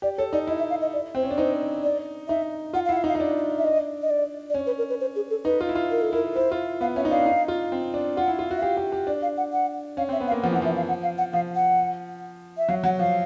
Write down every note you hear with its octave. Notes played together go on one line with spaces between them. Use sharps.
G4 D5
A4 C#5
D#4 D5
E4 D#5
E5
F5
D#5
D5
C4 C5
C#4
D4
D#4 C5
D5
D#4 E5
F4 F#5
F5
E4 F#5
F5
D#4
F5
D#4
D4
E5
D#5
D#5
D5
D5
C#4 C#5
B4
A#4
B4
C5
G#4
A4
D#4 B4
F4
E4
F4
A#4
A4
E4 A#4
E4 C5
F4
B3 F5
C#4 E5
D#4
D4 F5
D#4
F4
C4
D4
F4 F#5
E4
F4
F#4
E5
G4 F5
G4
G4
D4 D5
F5
F#5
F#5
C#4 F5
C4 E5
B3
F5
A#3
F3 F#5
E3 F#5
F3 E5
F5
F#5
F5
F#5
F3 F5
F#5
E5
F#3 F5
F#3 F#5
F3 F5